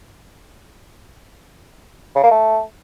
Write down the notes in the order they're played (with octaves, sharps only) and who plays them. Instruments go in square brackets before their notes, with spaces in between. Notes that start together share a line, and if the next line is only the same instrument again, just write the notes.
[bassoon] C#3
A#3
A3